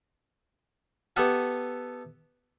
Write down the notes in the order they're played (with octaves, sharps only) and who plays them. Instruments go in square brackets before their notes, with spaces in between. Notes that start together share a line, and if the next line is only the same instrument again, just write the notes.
[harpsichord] B3 G4 A4 E5 F#5 G#5